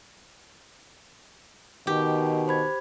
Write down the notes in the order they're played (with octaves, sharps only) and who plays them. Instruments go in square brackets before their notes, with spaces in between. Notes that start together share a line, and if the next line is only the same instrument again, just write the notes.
[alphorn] B2 [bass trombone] D#3 [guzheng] G4
[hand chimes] C5 B5 G#6